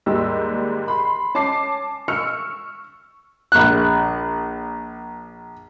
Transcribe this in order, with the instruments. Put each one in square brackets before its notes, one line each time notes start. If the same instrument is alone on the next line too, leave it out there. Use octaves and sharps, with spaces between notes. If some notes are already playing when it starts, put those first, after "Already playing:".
[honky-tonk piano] D#2 G#2 G3 E6
B5 C6
C#4 A5 D6 C7
C#6 E6 F6 C#7
[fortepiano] A#1 F#6